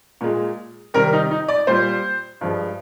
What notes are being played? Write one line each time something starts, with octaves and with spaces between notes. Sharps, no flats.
A#2 G#3
C3 D#3 G3 A#4
D#4
D#4
D5
A#2 G3 C5
G2 F3 G#3